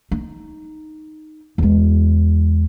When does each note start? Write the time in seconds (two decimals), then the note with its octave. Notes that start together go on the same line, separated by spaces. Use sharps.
0.11 D#4
1.58 E2 G#3